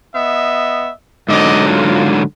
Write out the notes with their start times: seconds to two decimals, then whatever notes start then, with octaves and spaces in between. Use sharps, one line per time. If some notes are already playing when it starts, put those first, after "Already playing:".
0.15 B3 D#5 E5
1.28 G#2 D3 F#3 C4 D5 D#5
1.67 F4